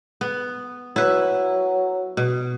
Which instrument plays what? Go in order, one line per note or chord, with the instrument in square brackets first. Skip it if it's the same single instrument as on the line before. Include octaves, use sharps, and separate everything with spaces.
[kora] B3
[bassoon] F#3 [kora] E4 B4
[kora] B2